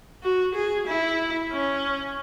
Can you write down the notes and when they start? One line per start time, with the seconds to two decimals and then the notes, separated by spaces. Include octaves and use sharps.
0.23 F#4
0.55 G#4
0.87 E4
1.52 C#4